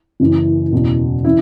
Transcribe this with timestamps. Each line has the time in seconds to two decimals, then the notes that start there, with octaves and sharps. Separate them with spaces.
0.20 F#1 F#2 E3
0.73 F#1 E2 B2
1.25 C#3 E3 E4